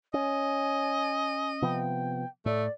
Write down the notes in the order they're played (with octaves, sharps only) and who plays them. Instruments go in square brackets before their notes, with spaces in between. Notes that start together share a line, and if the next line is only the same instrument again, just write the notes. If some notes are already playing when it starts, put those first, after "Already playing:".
[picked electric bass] C#4 [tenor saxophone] D#5 [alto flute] G#5
[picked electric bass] C3 F3 B3 [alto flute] G5
[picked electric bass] A2 [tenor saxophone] A3 [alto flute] D5